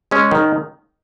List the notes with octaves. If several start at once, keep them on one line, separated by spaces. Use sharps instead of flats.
G#3 C#4
D#3